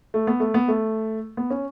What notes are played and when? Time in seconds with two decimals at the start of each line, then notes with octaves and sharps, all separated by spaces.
0.14 A3
0.27 B3
0.40 A3
0.54 B3
0.68 A3
1.37 B3
1.51 C#4